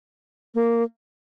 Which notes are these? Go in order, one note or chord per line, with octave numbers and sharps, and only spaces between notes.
A#3